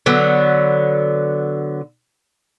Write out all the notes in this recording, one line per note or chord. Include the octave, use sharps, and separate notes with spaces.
D3 F#3 B3